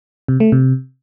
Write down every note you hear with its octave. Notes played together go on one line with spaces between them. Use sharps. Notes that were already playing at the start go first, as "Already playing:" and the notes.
C3
A3
C3